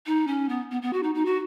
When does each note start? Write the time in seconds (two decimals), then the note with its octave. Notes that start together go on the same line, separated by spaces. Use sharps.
0.06 D#4
0.27 C#4
0.49 B3
0.71 B3
0.82 B3
0.93 F#4
1.03 D#4
1.15 D#4
1.25 F#4